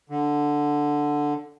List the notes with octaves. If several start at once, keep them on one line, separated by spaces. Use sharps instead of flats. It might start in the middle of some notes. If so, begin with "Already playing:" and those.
D3